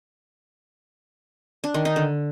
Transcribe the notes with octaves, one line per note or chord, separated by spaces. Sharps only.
D4
D#3
D#4
D3